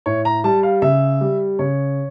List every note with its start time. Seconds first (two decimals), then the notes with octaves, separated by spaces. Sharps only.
0.06 A2 C#5
0.25 A#5
0.44 G3 A5
0.63 F5
0.82 C#3 E5
1.21 G3
1.59 C#3 C#5